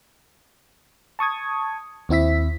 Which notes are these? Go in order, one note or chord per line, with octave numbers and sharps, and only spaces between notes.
A5 C#6 D#6 G#6
D#2 C4 E4 E5 B6